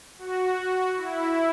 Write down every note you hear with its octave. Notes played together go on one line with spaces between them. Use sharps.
F#4
E4